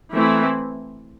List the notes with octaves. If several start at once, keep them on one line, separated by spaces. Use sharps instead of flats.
E3 A3 C4 E4